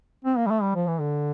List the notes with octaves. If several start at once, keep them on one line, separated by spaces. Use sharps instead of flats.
C4
A#3
G3
A3
G3
F3
E3
D3